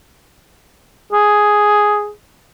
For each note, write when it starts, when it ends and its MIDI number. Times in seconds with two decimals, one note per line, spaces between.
1.13 2.11 68